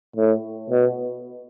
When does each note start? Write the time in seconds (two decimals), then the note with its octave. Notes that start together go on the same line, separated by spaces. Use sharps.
0.16 A2
0.70 B2